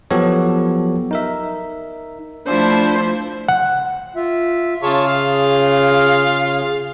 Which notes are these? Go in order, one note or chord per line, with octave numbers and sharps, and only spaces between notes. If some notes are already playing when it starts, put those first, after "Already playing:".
F3 F#3 B3 G4 A4 C#5
D#4 A#4 E5
F3 A3 D4 E4 C5
F#5
F4 E5
C#3 F4 G#4 C#5 A5
F4 F5